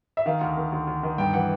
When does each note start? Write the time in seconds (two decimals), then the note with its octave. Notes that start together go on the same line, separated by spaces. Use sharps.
0.17 E5
0.26 D#3 F5
0.41 D2
0.57 D#3
0.72 D2
0.87 D2
1.03 D#3
1.18 G2 G5
1.33 E3 F#5